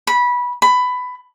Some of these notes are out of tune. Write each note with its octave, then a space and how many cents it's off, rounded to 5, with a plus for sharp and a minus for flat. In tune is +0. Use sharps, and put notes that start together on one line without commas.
B5 -15
B5 +15